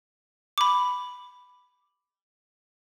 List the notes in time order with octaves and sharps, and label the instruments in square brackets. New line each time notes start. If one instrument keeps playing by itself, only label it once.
[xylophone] B5 D6